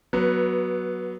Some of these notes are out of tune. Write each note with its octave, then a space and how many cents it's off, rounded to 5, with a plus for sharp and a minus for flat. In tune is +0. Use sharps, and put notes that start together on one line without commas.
F#3 +0 B3 -20 B4 +0